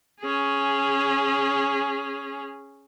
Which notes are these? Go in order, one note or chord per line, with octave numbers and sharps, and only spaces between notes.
C#4 G#4